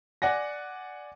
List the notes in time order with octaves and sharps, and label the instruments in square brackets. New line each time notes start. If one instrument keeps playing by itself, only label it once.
[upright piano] D5 F#5 G#5 A#6